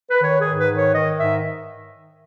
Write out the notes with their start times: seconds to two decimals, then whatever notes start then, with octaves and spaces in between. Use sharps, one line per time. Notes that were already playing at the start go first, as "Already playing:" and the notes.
0.10 B4
0.21 D#3 C#5
0.40 G#4
0.45 G#2
0.58 B4
0.70 D#3
0.76 C#5
0.94 D#3 D#5
1.18 G#2 E5